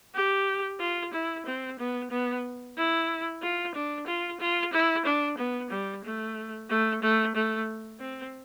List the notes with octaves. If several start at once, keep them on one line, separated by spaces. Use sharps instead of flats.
G4
F4
E4
C4
B3
B3
E4
F4
D4
F4
F4
E4
D4
B3
G3
A3
A3
A3
A3
C4